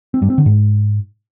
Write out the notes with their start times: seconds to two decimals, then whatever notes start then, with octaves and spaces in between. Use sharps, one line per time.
0.14 C4
0.22 G2
0.30 C4
0.38 D3
0.46 G#2